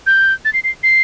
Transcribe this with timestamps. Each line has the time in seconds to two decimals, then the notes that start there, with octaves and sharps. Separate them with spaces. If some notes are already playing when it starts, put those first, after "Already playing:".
0.06 G6
0.45 A6
0.53 C7
0.64 C7
0.83 C7